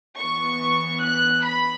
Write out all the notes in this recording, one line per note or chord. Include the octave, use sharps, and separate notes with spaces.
E3 B3 C#6
F#6
B5